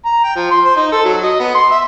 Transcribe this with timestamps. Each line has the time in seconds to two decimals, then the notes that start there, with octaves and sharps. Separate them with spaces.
0.05 A#5
0.24 G5
0.36 F3
0.51 C6
0.64 C5
0.77 D#4
0.92 A4
1.05 F#3
1.23 D#5
1.40 B3
1.55 C6
1.72 E5